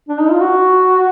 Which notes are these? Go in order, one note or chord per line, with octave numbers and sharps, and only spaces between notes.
D4
D#4
F4
F#4